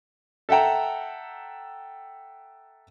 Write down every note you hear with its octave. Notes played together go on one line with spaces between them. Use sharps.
A4 E5 F#5 G5 A#5